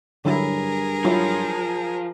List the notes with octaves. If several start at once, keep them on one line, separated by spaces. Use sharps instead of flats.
G2 D3 F#3 E4 G#4 A#4
F3 F#3 E4 F4